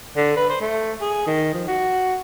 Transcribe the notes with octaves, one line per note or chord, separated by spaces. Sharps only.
D3
B4
C5
A3
G#4
D#3
F3
F#4